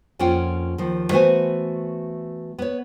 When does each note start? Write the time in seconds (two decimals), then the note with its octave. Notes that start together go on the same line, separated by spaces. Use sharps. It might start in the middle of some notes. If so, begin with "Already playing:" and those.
0.19 F2 A#3 C#4 F4 F#5 G5
0.78 D#2 F3
1.11 E3 A3 B3 F#4 C5 G#5
2.59 B3 C#5